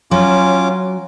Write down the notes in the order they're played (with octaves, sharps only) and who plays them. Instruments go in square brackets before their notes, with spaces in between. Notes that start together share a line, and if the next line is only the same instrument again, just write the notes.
[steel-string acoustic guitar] F#3 [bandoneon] C#4 F4 D6